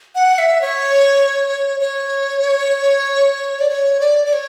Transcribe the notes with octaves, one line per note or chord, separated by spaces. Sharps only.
F#5
E5
C#5
C#5
D5
C#5
D5
D5
C#5